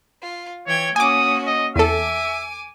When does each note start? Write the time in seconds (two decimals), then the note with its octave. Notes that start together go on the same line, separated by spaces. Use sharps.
0.22 F4
0.66 E3 C#5 G5 G#6
0.96 A#3 C#4 F#4 G#5 D6 D#6
1.47 D#5
1.76 E2 A4 E5 G#5 D6